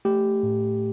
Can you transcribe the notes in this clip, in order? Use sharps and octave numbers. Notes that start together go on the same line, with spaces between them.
A3 G4
A2